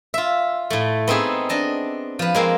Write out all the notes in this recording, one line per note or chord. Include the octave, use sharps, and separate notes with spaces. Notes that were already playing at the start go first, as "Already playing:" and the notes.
F4 E5
A2 A3
B3 C4 D#4 G#4 E5
D4 D#5 A5
F3 B4
G#3 A#3 C4